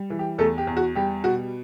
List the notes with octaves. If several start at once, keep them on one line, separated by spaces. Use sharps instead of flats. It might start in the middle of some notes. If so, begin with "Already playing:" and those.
Already playing: G3
E3
G4
E2 A3 A4
G4
E2
F#4
G3 G4
B2 F#4